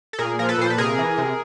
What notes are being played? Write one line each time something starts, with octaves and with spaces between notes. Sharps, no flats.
A4
A#2 G#4 A#4
F3 A#4
A4 B4
A#2 C5
B4
C3 G#4 A#4
E3
C3